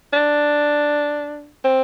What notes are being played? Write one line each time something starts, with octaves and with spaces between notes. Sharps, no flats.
D4
C4